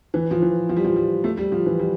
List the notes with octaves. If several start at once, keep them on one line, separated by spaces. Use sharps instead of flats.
E3
F3
E3
F3
G3
F3
G3
A3
G3
F3
E3
G3